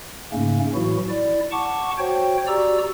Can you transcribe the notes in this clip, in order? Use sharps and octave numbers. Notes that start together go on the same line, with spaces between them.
G#2 C#3 A3 A#3 C#4
A2 E3 F#3 E4 F#4
E4 D5
F#5 A5 C#6 D6
F#4 C5 C#5 G5
F#4 G4 D5 A#5 E6